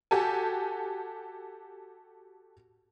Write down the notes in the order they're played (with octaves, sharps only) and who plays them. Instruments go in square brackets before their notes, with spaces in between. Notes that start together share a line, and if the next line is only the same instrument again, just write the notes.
[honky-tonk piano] F#4 G4 A4 G#5